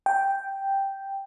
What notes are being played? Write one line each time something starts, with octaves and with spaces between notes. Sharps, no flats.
G5